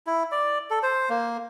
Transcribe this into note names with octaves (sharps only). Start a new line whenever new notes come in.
E4
D5
A4
C5
A#3